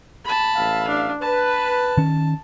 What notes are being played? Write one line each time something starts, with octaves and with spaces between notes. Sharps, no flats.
A5 B5
A1 E5 F5
D4
B4 A5
D#3 C#4